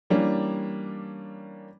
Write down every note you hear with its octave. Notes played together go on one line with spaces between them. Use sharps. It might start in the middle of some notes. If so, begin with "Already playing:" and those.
E3 G3 A#3 C#4 D4